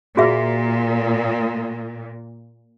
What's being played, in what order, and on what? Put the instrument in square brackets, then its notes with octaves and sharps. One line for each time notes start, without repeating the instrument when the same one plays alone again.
[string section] A#2 [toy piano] F#4 G#4 E5